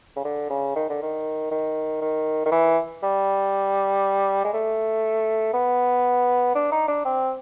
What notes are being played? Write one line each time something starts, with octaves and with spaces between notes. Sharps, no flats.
C#3
D3
C#3
D#3
D3
D#3
D#3
D#3
D#3
E3
G3
G#3
A3
B3
D4
D#4
D4
C4